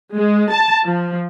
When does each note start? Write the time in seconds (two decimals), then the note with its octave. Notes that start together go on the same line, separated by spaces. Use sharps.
0.16 G#3
0.52 A5
0.85 F3